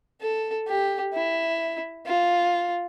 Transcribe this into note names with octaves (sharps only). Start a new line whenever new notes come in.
A4
G4
E4
F4